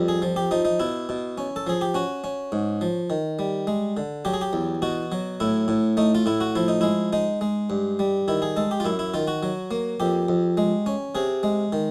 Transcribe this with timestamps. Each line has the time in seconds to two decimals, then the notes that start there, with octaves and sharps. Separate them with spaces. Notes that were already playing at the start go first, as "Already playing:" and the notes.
Already playing: F2 G3
0.08 G#4
0.22 F3
0.36 G4
0.51 F3 D#4
0.65 D#4
0.80 B2 E4
1.09 B2
1.38 C#4
1.56 A4
1.67 F3 G#4
1.81 G4
1.94 C#4 F#4
2.24 C#4
2.52 G#2
2.81 F3
3.10 D#3
3.39 G3
3.67 G#3
3.97 D3
4.25 F#3 G4
4.34 G#4
4.41 G4
4.53 E2
4.82 B2 F#4
5.12 F#3
5.40 A2 E4
5.68 A2
5.97 A3 D#4
6.15 F4
6.26 A2 E4
6.41 F#4
6.56 F3 E4
6.68 D#4
6.81 G#3 E4
7.13 G#3 D#4
7.41 G#3
7.70 G2
7.99 G3
8.28 D#3 E4
8.42 G#4
8.57 G#3 A4
8.71 G4
8.80 F4
8.85 F#2 E4
8.99 E4
9.14 D#3 F4
9.28 F#4
9.43 F#3
9.71 A#3
10.00 F2 G4
10.28 F2
10.57 G#3
10.86 C#4
11.15 C3 G#4
11.43 G#3
11.73 D#3